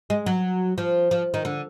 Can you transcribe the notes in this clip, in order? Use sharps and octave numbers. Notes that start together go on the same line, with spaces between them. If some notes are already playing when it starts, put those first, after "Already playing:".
G#3
F#3
F3
F3
D#3
D3